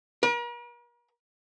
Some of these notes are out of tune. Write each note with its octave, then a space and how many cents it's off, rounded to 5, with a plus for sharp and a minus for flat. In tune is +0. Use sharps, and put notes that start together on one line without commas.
A#4 +45